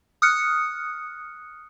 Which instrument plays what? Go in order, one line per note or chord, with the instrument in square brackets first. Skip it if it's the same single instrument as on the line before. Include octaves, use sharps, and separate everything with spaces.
[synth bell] D#6 F6 F#6 C#7